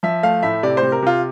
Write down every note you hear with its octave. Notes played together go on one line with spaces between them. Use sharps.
F3 E5
A3 F5
A2 E5
C3 D5
C5
C3
A#4
C3 F4